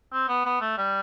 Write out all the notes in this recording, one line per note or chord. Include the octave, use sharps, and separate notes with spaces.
C4
B3
B3
A3
G3